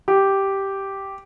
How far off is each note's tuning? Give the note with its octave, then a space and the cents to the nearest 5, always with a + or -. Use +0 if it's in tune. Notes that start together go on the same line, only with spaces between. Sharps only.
G4 -5